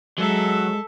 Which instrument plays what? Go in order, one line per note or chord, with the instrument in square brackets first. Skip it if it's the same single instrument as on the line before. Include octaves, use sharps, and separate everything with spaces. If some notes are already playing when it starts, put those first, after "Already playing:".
[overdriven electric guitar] F#3 [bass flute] G#3 [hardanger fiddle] A4 E5